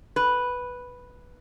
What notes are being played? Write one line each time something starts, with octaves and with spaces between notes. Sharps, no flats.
B4